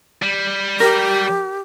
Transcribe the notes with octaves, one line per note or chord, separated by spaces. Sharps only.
G3
G4 A#4